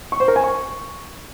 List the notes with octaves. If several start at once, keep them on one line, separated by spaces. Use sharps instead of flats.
C#6
C5
A#4
G#5
C#6